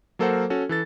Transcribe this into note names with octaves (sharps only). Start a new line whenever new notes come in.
F#3 A#3 A4 A#4 C5 F#5
C#4 F#4 A4
E3 A4 A6